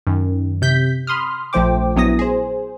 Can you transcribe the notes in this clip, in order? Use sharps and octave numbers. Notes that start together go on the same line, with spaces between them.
F#2 D#3
C3 G6 B6
B5 C6 D#6 F6
A#1 F3 A3 C5 G5 D6
A#1 F#3 B3 E4 D#6 A#6
G#4 C5